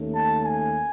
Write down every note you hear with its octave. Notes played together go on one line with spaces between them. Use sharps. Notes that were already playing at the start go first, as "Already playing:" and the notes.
Already playing: D#2 D#3 A3 C#4
A5
G#5